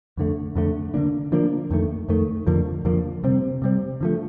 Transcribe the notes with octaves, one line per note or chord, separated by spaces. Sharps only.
F2 D3 A3
F2 D3 A3
D3 F3 A#3 D4
D3 F3 A#3 D4
F2 D#3 A3
F2 D#3 A3
F2 D3 F3 A#3
F2 D3 F3 A#3
C3 G3 C4
C3 G3 C4
D3 F3 A3